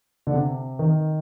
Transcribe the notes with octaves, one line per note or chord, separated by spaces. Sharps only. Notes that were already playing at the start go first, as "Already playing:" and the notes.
D3
C3
D#3